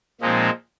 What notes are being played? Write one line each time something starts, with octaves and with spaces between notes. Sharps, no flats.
A#2 F3 G#3 C4 D#4